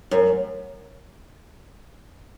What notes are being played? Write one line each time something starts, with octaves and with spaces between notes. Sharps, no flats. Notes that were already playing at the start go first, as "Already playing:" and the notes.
F#2